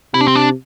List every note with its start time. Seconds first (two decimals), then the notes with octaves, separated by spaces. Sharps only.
0.14 C3 E4
0.21 D4
0.28 C4
0.35 D4